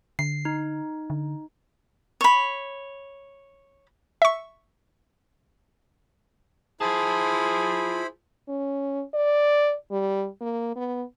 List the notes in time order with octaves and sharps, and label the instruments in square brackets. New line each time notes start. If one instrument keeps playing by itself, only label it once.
[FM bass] D3 [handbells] C7
[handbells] D#4
[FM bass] D3
[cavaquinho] C#5 B5
[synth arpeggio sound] E5 C#6
[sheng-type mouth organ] E4 C5 B5 [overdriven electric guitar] F4 A5 [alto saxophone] G#4
[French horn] C#4
D5
G3
A#3
B3